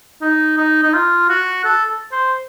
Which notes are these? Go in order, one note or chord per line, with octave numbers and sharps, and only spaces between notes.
D#4
D#4
D#4
F4
F#4
A4
C5